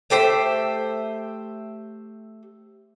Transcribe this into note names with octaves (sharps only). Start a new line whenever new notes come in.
A3 G4 C5 E5